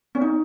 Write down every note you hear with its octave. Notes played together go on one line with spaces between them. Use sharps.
C#4
D#4